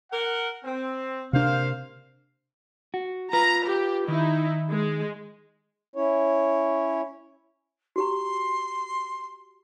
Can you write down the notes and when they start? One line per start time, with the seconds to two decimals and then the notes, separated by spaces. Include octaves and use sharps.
0.11 A#4 F#5
0.64 C4
1.33 C3 A#3 D4 C5 F5
2.94 F#4
3.33 F4 B4 A#5
3.66 G4
4.08 D#3 D#4 E4
4.70 G#3
5.96 C#4 E4 C#5
7.96 F#4 G4 A#5 C6